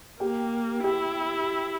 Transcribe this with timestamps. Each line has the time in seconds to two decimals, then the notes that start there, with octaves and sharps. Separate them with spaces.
0.20 A#3 G4 G5
0.84 E4 G4 G5